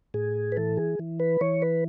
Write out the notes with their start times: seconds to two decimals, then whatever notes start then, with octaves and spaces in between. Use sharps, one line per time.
0.14 A2 G#4
0.52 B4
0.57 E3 A4
0.77 G#4
0.99 E3
1.20 B4
1.41 E3 C#5
1.62 B4